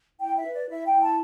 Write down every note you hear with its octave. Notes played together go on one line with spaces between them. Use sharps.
E4 G5
E5
B4
D5
E4 E5
G5
E4
A5